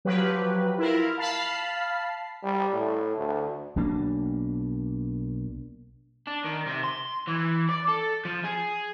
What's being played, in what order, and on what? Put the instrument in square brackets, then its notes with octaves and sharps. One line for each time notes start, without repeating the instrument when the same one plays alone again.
[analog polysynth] F3 F#3 G4 B4
E4 F4 A#4
F5 A5 B5 C7
[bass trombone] G3
A2
D2
[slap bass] B1 B2 A#3 D4
[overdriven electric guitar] D4
D#3
C3
C6
E3
D5
A4
F3
G#4